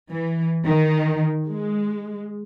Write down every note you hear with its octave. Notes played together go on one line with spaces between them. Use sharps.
E3
D#3
G#3